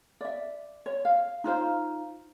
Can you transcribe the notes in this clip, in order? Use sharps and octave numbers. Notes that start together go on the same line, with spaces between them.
D5 E5
C#5
F5
D#4 F4 C5 F5